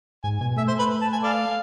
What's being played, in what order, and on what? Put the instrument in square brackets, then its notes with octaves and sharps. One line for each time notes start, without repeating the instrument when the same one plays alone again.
[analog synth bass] G#2 [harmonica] G#5
[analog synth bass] B2 [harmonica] G#5
[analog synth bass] A3 [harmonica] E5
[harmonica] C5
B4
A5
G#5
A4 D5 F5